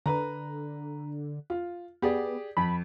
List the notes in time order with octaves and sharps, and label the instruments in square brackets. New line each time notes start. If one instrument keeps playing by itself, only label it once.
[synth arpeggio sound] D3 [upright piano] B4 A#5
[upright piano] F4
[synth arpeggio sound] B3 [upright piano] G4 G#4 D5
[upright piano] F2 [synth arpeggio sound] B5